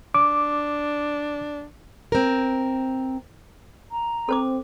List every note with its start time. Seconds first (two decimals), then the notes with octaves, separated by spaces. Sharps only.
0.15 D4 D6
2.12 C4 A#4
3.91 A#5
4.29 C4 A4 C5 D6